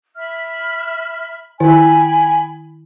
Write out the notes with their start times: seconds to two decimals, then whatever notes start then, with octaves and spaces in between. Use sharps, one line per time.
0.16 E5 B5 F6
1.60 D#3 E4 G5 G#5 B5